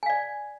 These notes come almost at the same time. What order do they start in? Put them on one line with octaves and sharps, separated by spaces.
G#5 F5 D5